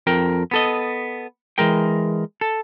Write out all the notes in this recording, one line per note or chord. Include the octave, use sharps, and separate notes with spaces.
F2 A#4 G5
B3 A4 D#5
E3 G#3 A#4 G5
A4